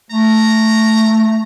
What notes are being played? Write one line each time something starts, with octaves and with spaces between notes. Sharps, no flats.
A3 A#5